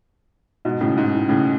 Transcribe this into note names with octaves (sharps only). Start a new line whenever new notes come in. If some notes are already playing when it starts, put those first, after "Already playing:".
G#2 B2
A2 C#3
G#2
A2
A2 C#3